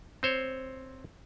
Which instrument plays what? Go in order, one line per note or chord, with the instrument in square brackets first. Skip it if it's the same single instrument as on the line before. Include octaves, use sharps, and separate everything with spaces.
[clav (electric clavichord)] C4 C5 C#5